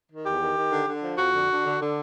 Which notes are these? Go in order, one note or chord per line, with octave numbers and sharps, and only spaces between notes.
D#3
E2 G4
D#3
D#3
D3
D3
F3
F2 F#4
D3
D3
D3
D3